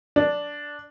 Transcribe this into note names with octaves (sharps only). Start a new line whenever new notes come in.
D4